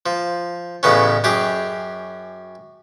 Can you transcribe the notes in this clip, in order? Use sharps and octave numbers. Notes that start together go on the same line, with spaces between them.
F3
A1 A2 C#3 B3 C#4
F#2 G4 G#4